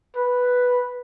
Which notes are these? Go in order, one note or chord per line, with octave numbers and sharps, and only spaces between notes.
B4